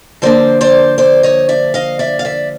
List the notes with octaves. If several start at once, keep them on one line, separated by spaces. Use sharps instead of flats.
D3 F3 A#3 D4 C5 D5
C5 D5
C5 D5
C#5 D#5
D5 E5
D#5 F5
D5 E5
F5
D5 E5